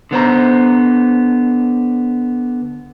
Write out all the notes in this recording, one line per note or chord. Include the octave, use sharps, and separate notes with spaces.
D3 B3 C5 A#5